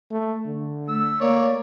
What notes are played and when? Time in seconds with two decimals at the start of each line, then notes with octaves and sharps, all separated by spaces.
0.11 A3
0.46 D3
0.89 A3 E6
1.21 A#3 C#5 D5